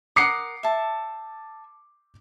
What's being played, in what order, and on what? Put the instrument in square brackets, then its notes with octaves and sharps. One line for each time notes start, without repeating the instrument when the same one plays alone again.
[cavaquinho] A#4 F#5 D#6 [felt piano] D6 C7 C#7
[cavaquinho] E5 A5